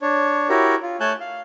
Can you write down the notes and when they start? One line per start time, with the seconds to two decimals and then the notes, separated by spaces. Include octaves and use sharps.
0.02 D4 C#5
0.49 E4 F#4 G4 A#4 C#5
0.82 F4
1.00 A3 C#5 G#5 A5 F#6 G6
1.20 F5